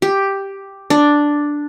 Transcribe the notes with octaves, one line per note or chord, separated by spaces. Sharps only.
G4
D4